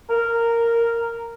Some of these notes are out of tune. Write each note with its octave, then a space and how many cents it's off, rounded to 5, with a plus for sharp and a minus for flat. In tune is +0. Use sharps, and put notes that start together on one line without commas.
A#4 -10